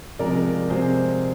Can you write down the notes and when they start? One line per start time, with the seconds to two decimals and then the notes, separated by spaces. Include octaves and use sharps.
0.19 C3 F3 G#3 C4 A#4 D5
0.70 C3 F3 G#3 C4 G#4 C5